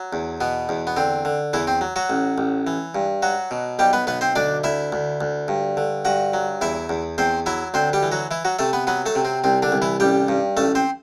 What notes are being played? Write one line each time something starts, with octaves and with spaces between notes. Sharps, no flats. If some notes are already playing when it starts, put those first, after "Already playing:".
Already playing: F#3
E2
B2 B3
E2
B3
D3 C4
D3
E2 E3 E4
C4
F#3
F#3 F#4
A1
A1
E3
G2
F#3 F#4
B2
B1 G3 G4
B3 B4
B1 B3 B4
C4 C5
D2 D4 D5
D2 E4 E5
D2
D2
G2
D3
G2 F#4 F#5
F#3
E2 E4 E5
E2
E2 C4 C5
F#3 E4 E5
D2 C4 C5
G3 G4
E3
F#3 F#4
E3 E4
F#3 F#4
C3 A3 A4
B3 B4
F#3 B3 B4
A3 A4
C3
C4
C2 C4
D3 D4
C2
E3 E4
A1 G3 G4
G2
A1 A3 A4
C4 C5